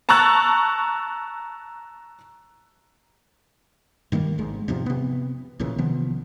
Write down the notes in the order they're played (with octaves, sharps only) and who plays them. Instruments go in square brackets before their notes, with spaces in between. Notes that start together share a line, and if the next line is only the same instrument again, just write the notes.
[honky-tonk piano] A5 A#5 C#6 E6 F#6 A6
[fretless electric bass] G2 D#3 G3 A#3
G#1 G#2
E2 G#2 C3 F3
C3 B3
A#1 A#2 C#3 E3
C3 D#3 F3 B3